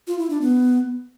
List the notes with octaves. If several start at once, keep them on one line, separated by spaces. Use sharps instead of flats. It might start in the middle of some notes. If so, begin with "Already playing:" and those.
F4
E4
D4
B3